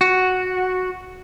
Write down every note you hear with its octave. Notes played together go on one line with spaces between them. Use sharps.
F#4